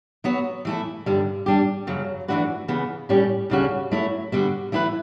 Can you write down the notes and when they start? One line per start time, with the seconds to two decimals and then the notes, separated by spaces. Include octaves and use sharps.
0.24 F#3 B3 F#4 C#5
0.65 E3 A3 E4 A4
1.06 G2 D3 G3
1.46 G3 D4 G4
1.87 F#2 C#3 F#3
2.28 E3 A3 D4 F#4 B4
2.68 C#3 E3 B3
3.09 A2 G3 C#4 G4
3.50 D2 C#3 G3 C#4 F#4
3.91 F#3 A3 E4 A4 C#5
4.32 D3 G3 B3 F#4
4.72 E3 A3 E4 G4 B4